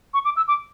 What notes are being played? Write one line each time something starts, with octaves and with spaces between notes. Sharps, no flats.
C#6
D6
E6
D6